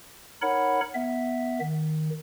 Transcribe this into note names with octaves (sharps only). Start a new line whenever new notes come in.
D#4 A#4 C#5 F#5 B5
B3 E5
D#3